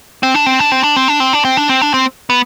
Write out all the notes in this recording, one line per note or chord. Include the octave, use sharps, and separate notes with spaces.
C4
D4
C4
D4
C4
D4
C4
D4
C4
D4
C4
D4
C4
D4
C4
B3